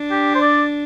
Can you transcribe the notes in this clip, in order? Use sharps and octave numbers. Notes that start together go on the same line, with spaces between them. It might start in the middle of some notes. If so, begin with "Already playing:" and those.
Already playing: D4
G4
C5
D5